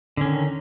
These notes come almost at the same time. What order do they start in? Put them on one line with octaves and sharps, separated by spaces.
D3 C#4 D#3